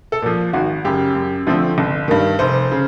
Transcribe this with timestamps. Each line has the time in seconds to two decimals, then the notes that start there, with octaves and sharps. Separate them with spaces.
0.12 A4
0.22 A#2 F3
0.53 G#1 F#4
0.84 F#2 C#3 G4
1.15 F#2
1.47 D3 F3 A3 C4
1.78 G1
2.08 G2 D#3
2.39 F1 C5
2.72 C#3